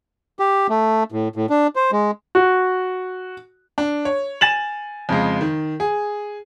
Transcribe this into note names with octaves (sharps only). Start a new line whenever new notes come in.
G4
A3
A2
A2
D4
C5
G#3
F#4
D4
C#5
G#5 A6 E7 F#7
F2 C#3 G#3
D#3
G#4